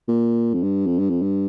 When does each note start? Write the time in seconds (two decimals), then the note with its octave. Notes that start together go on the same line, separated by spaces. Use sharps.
0.08 A#2
0.54 F2
0.63 G2
0.87 F2
0.99 G2
1.10 F2
1.23 G2